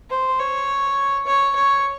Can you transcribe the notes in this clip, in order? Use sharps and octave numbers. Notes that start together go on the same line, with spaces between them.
C5
C#5
C#5
C#5